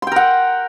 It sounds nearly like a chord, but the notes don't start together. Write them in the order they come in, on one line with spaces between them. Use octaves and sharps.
C6 G5 A#4 F#5